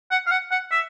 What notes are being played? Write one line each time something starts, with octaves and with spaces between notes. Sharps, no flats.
F#5
F5
F#5
F#5
E5